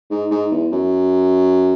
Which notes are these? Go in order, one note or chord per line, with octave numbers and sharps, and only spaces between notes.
G#2
G#2
E2
F#2